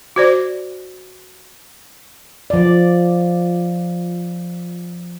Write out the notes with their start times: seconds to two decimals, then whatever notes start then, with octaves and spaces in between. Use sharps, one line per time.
0.16 F#4 C5 D5
2.50 F3 D5